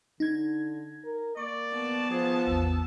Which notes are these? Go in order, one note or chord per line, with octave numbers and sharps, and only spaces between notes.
D3 D#4 G#6
A#4
A#3 D5 C#6
B3 A5
F3 G#4
A1 E2 E6